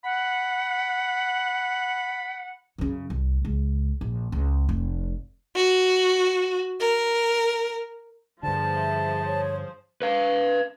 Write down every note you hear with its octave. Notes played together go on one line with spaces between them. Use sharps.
F#5 B5
F#2 C#3
C2
C#2
A#1
C#2
F1
F#4
A#4
G2 D3 F3 G#4 C5 A5
E5
C#5
B4 F5